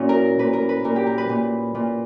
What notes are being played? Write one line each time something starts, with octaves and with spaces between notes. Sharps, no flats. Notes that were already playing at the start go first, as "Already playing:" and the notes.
Already playing: A#2 C#4 E4 F#4
A#4
A#2 B4
A#4
B4
A#2 A#4
G4
A#4
B4
A#2
A#2